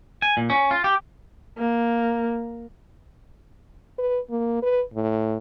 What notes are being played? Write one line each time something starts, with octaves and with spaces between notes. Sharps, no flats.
G#5
A#2
C#4
F4
G4
A#3
B4
A#3
B4
A2